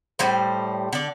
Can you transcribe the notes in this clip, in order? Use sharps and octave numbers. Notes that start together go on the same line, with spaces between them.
A2 G3 C5
D3 D5